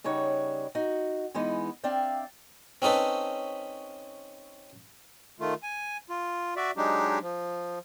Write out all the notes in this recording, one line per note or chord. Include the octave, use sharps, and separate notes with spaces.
C#3 G3 D#4 C#5 F#5
D#4 F#4
E3 G#3 B3 D#4
C4 D4 D5 E5 F5 G5
C4 C#4 D#4 A4 B4
D#3 A3 F4
G#5
F4
F#4 D5 E5
F#3 G#3 D4 D#4 G4
F3